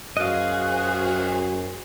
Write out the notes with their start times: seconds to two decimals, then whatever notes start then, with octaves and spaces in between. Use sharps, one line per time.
0.17 F#2 F#4 G#4 C5 D#5 F5 F#6